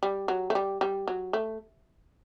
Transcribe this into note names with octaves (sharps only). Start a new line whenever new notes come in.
G3
F#3
A3
G3
G3
F#3
A3